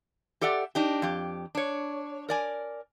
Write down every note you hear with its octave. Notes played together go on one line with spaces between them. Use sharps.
G4 A4 D5 E5 F#5
D4 D#4 G4
F2 G4
D4 C#5
A#4 D5 G#5